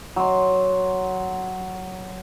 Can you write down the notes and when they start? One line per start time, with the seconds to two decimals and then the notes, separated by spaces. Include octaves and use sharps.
0.16 F#3 C6